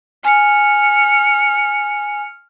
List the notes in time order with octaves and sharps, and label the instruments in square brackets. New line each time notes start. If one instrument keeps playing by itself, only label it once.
[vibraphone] G#5 [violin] F6 C#7